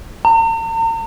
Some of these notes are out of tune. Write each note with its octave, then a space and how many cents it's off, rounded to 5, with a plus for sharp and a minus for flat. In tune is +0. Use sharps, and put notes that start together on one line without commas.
A#5 -45